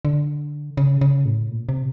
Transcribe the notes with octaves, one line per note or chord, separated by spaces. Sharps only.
D3
C#3
C#3
A2
A#2
C3